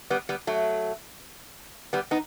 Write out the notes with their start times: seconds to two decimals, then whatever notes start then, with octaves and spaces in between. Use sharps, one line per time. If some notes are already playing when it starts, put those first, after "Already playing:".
0.10 G3 B3
0.29 G3 B3
0.47 F#3 A3
1.93 G3 B3
2.11 B3 D#4